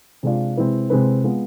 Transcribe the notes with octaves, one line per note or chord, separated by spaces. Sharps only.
C3 G#3 D4 F4
C3 G#3 C4 E4 B4
C3 G#3 C4 E4 B4
G#3 B3 F4